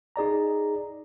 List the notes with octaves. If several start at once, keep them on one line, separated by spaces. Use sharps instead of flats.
D#4 G#4 D5 A#5